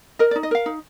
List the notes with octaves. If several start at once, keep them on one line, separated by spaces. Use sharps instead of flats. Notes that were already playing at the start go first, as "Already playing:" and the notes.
A#4 D#5
D5
D#4
D#5
A#4 F5
D#4